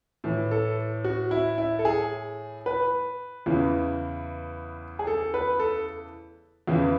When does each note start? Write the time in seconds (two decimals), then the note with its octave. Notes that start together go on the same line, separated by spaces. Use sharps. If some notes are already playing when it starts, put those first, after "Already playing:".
0.24 A2 E3
0.51 A4
1.04 F#4
1.31 E4
1.58 E4
1.79 A4
1.85 G#4
2.66 B4
3.46 E2 C#3 E3
4.99 G#4
5.07 A4
5.34 B4
5.60 A4
6.68 E2 C#3 E3